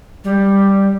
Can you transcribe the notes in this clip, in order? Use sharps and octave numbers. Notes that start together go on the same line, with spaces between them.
G3